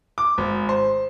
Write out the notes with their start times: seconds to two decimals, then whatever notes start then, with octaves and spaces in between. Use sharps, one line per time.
0.18 D6
0.38 G#1
0.69 C5